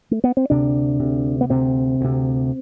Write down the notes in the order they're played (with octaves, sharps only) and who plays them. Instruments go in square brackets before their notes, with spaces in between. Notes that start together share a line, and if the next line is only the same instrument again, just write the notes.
[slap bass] A3
B3
C4
D2 C3 D4
D2 C3
B3
D2 C3 C4
D2 C3